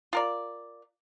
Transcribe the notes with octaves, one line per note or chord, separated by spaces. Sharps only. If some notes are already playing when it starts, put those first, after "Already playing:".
F4 A#4 D5